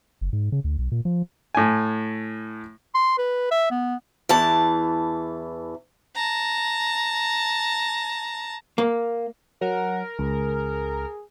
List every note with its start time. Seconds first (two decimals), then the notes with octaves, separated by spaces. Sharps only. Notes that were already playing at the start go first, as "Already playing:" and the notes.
0.21 F#1
0.33 G#2
0.52 C#3
0.64 D2
0.78 B1
0.92 A#2
1.05 F3
1.55 A2 G#5
2.94 C6
3.18 B4
3.51 E5
3.70 B3
4.29 E2 E3 A5
6.15 A5 A#5
8.78 A#3
9.61 F#3 A#4 F#5
10.19 C#2 G#4